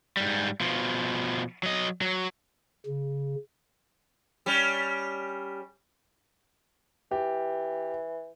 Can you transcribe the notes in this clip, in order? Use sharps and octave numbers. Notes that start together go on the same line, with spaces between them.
G#2 G3
B2 F3
F#3 D#5
F#3
C#3
G3 C#4
E3 G4